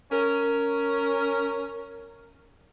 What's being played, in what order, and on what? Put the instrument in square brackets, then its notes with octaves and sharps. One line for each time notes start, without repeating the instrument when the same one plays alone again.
[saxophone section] C#4 A#4